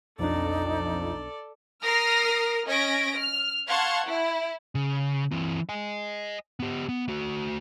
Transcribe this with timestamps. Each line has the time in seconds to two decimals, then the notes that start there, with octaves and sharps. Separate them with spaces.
0.19 B1 F2 D4 D#4 A4 D5
1.83 A#4 D#6 F6 A#6 C7
2.67 C#4 D#5 G#6 A#6 B6 D7
3.16 F6
3.68 F5 F#5 A5 C6 C#6 G#6
4.06 E4
4.75 C#3
5.31 E3 C4
5.69 D#5 G#5
6.60 B3 G4
6.89 B3
7.08 A3 F#4